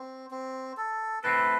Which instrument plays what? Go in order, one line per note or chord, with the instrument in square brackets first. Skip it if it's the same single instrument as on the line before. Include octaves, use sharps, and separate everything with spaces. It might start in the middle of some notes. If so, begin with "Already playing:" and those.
Already playing: [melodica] C4
C4
A4
[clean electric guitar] A3 C4 E4 A4 [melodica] B4